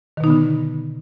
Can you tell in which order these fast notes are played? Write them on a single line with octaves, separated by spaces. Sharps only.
D#3 B2 D#4 B3 D3